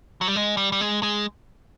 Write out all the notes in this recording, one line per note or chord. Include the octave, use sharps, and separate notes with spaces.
F#3
G3
G#3
G3
G3
G#3
G#3